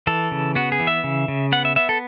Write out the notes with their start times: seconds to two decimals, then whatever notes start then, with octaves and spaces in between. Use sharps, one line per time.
0.07 E3 A4
0.31 C#3
0.55 B3 F#4
0.72 G#4
0.80 E3
0.87 E5
1.04 C#3
1.28 C#3
1.52 B3 F#5
1.65 E5
1.76 B3 E5
1.89 A4